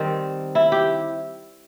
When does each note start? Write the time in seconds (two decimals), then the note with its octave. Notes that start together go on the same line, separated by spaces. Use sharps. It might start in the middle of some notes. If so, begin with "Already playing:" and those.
Already playing: D#3 G3 C4
0.55 E4
0.72 G4